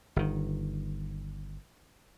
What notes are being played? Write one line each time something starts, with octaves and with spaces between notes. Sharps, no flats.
G1 D#3